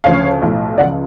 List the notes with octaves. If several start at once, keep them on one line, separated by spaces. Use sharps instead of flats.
D2 C#3 F3 C#5 F5
B1 A2 F3
C#2 C#3 F3 D5 F#5